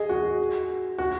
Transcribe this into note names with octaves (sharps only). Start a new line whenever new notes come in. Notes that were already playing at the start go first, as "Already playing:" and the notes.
Already playing: G#4 D#5
F#4
F#4